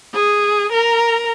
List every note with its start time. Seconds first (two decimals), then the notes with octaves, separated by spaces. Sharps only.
0.14 G#4
0.72 A#4 A#5